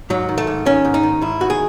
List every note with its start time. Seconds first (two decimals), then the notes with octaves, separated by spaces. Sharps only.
0.10 G#2 F#3
0.29 D#3
0.38 A3
0.47 G#2
0.66 D#3 C#4
0.85 G#2
0.94 D#4
1.03 D#3
1.21 G#2 E4
1.40 D#3 F#4
1.50 G#4